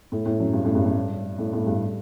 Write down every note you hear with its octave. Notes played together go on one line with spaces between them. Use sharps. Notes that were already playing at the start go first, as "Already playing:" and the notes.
A2
A2
F#2
G2
A2
G2
G2
A2
A2
G2